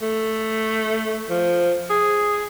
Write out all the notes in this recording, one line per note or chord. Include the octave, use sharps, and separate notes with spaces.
A3
F3
G#4